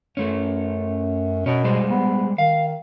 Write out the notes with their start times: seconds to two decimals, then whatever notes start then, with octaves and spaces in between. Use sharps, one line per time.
0.17 F#2 A3 C#4
1.46 B2 C#4 A#4
1.64 G3 G#3 C5
1.89 B3
2.38 D#3 F5